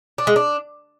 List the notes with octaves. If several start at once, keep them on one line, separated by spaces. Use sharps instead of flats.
D4
G#3
D4